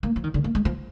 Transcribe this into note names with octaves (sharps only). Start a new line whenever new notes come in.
A#3
F3
D#3
D3
A#3
G#3
F3